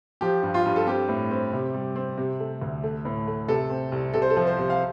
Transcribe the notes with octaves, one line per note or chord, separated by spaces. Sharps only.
F3 G4
G2
F4
G2
A4
C4 G4
A2
C4
C3
G3
C4
C3
A3
D2
A3
A2
A3
C3 A4
C4
C2
C3 A4
C5
A4
F3
C5
C3
F5